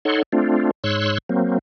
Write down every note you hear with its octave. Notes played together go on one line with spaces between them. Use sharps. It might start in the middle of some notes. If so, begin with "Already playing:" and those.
D#4 A4 C#5 F#5 C6
A3 C4 D4 F4
G#2 C#5 C6 E6 F#6
F#3 A#3 C4